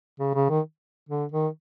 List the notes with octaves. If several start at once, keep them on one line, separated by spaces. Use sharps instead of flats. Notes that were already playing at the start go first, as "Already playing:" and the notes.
C#3
C#3
D#3
D3
D#3